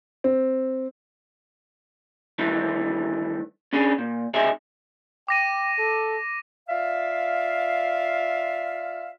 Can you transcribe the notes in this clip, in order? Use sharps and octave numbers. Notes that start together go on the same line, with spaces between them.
C4
G2 D#3 E3 A3
C#4 D4 G#4
A#2
C#2 C3 D#4 G#4 E5
G5 D6 A#6 D#7
A4
F4 D5 E5 F5